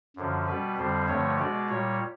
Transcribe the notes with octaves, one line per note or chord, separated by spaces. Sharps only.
F#2 D3 F3
B2 G3 B4
F2 D3 G3 C5
G2 D3 F3 A3 C#5
B2 G#3 D5
A#2 G3 C#5